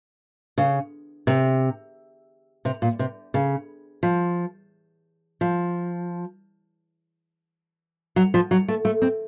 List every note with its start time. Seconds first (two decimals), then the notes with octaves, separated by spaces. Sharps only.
0.58 C#3
1.27 C3
2.65 C3
2.82 A#2
2.99 C3
3.34 C#3
4.03 F3
5.41 F3
8.16 F#3
8.34 F3
8.51 F#3
8.68 A3
8.85 A3
9.02 C4